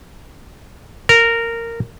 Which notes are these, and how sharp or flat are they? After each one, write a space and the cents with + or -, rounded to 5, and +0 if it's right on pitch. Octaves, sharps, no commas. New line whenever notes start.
A#4 -15